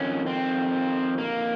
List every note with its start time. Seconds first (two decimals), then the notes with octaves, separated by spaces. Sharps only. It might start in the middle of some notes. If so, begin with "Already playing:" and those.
Already playing: F2 D#3 C#4
0.27 C4
1.18 A#3